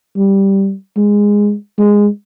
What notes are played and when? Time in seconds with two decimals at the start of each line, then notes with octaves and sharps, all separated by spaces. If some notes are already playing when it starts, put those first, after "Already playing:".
0.16 G3
0.97 G#3
1.79 G#3